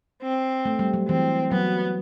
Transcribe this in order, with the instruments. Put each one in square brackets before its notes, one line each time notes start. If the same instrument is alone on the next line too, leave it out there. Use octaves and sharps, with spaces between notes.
[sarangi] C4
[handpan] A3
G3
F#3
[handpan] E3 [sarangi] C4
[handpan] F#3 [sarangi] B3